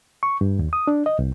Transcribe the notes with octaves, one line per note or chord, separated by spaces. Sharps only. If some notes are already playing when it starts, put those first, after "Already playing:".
C#6
G2
D#2
D#6
D4
D#5
C2